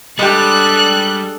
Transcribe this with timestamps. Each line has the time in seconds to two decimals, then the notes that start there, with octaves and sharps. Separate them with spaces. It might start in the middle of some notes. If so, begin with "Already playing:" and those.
0.19 G3 G#3 D4 G4 A4 F#6